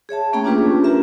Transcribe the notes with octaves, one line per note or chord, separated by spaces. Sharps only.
G#4 C#5 E5 A5
A3 A#3 C#4 G#4 G5 A#5
C#4 D4 F4 G4 B4
F4 G4 A#4 E5 A#5